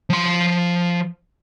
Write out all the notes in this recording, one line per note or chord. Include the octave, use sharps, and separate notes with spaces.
F3 C6